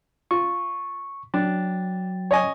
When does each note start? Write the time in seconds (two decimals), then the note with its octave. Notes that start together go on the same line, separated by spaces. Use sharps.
0.31 F4 C#6
1.34 F#3 D4 G5 A6
2.31 C#5 D#5 G#5